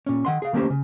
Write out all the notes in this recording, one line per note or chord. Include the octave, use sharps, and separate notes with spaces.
A#2 C#4
D#3 F#5 C6
G#4 F5
D#3 A3 A#3 C#4 G4 C5
C#3